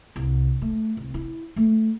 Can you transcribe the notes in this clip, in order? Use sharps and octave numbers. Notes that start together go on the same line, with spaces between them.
C2
A3
C2
E4
A3